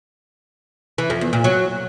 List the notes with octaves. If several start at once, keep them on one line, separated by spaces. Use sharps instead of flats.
E3
F2
E2
A#2
F#3